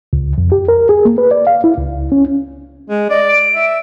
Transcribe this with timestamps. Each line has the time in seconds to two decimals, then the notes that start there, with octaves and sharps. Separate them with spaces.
0.13 C#2
0.38 F2
0.52 G4
0.68 A#4
0.89 G#4
1.05 A#3
1.18 B4
1.31 D5
1.47 F5
1.64 E4
1.78 C#2
2.12 C#4
2.88 G#3
3.10 D5 D#5
3.28 D7
3.55 E5